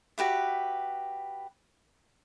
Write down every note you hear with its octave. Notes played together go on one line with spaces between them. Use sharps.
F#4 G4 B4 E5